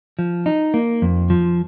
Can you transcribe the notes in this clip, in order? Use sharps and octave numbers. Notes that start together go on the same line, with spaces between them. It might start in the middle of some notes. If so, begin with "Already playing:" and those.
F3
D#4
A#3
F2
F3